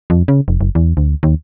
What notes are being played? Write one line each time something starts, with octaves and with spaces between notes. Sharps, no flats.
F2
C#3
F1
F#1
E2
D2
D#2